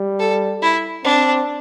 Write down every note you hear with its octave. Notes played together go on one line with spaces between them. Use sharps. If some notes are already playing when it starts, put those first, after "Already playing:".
Already playing: G3
A4
E4
C4 D4